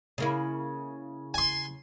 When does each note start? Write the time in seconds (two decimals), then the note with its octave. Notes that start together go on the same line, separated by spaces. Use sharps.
0.18 C#3 A#3 E4
1.34 G#5 C6